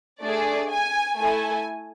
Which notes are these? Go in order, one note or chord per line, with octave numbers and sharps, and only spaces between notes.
A3 D4 G#4 D5
G#5
A3 E4 A4 G#5